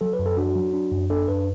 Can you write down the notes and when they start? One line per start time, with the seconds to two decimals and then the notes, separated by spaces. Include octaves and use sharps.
0.01 F#3 A4
0.13 B4
0.19 F#2
0.26 A4
0.37 D4 F#4
0.55 F#3
0.73 D4
0.92 F#2
1.10 D4 A4
1.28 F#2 B4